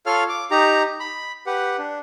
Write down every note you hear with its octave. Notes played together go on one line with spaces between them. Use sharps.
F4 A4 C#5 F5 F6
D6
D#4 G4 A#5
B5
G4 B4 F#5
D4